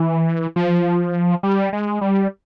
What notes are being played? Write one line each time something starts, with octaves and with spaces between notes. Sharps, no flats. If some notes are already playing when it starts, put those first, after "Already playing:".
Already playing: E3
F3
G3
G#3
G3